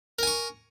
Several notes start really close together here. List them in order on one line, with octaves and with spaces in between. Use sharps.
A#4 G#5 C#6